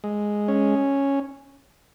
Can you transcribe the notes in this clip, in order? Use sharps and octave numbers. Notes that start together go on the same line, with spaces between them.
G#3
C#4